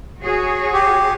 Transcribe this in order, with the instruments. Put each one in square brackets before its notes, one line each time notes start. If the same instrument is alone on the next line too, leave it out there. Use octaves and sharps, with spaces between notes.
[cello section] F#4 G#4 C#5
[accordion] G4